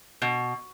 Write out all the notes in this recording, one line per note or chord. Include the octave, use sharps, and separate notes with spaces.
B2